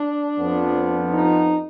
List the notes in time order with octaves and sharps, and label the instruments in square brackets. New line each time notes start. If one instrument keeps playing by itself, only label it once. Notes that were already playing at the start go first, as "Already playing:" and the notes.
Already playing: [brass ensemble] D4
F2 F3 B3
D#4